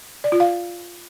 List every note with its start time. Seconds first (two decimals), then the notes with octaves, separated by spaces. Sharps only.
0.24 D5
0.32 F4
0.40 F5